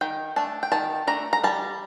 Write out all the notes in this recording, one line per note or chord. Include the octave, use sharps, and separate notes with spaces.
D#3 G5
A3 D4 A5
G5
D#3 A5
A3 D4 A#5
A#5
G3 A5